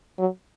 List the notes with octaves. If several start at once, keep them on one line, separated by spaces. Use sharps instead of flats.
F#3